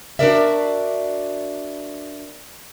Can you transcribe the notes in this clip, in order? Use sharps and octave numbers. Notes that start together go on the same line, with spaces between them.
D4 D#4 F#4 A#4 D5 E5